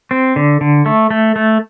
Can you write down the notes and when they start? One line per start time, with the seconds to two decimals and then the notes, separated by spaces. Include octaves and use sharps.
0.11 C4
0.36 D3
0.61 D3
0.86 A3
1.11 A3
1.36 A3